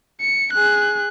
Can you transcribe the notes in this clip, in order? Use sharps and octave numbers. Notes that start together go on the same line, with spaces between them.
C#7
G#4 F#6